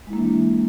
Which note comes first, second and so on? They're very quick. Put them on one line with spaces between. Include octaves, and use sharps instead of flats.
G#3 E4 A#3 D4 E3